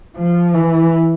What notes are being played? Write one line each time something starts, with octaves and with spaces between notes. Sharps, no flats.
F3
E3